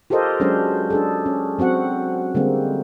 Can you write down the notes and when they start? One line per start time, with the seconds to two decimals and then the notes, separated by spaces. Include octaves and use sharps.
0.10 F4 G4 A4 A#4 C5 D#5
0.40 F#3 G#3 C#4 D4 C5
0.90 D4 G#4 A4
1.26 C#4
1.59 F#3 C4 F#4 F#5
2.35 D3 G3 G#3 A#3 C4